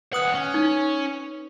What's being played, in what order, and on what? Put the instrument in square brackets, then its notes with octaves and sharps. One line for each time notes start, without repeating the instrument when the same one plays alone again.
[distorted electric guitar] D#2 F#5 [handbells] B4 D#6 F#6
[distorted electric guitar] C#4
[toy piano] D#4